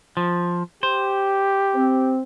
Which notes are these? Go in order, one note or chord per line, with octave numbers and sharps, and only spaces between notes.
F3
G4 C5
C4